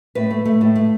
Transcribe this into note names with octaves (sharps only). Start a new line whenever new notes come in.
A2 B4
A3
A3
A2
A3